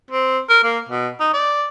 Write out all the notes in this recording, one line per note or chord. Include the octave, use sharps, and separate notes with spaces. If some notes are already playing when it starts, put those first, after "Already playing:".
C4
A#4
A#3
B2
D#4
D5